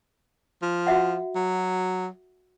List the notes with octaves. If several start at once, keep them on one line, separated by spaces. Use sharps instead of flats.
F3
F#4 E5 F#5
F#3